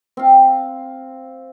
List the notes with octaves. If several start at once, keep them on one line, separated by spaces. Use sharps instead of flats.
C4 F5